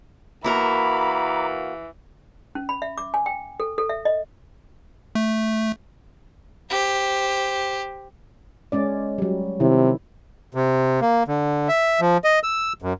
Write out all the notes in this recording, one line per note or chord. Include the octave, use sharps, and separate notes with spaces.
E3 A#3 F#4 A#4 A#5 B5 D6
C#4
B5
E5
D6
G#5
G5
A4
A4
E5
D#5
A3
G4 C5
G#3 C#4 D5
F#3 G3
C3 D#3 E4
C3
A#3
D3
E5
F3
D#5
E6
F#2